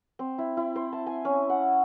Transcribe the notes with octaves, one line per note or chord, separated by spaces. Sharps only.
C4
E4
E4
C5
A5
G#5
C#4
F#5